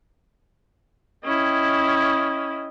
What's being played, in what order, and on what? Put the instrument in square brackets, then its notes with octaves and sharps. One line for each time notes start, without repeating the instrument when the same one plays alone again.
[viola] C#4 E4 [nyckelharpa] D#5 G5